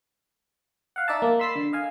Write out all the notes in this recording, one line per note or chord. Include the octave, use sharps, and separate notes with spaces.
F5 F#5
D#4 D5 E5 A5
A#3
B5 C6 E6 A6 B6 C7
D3
D#5 F5 G#5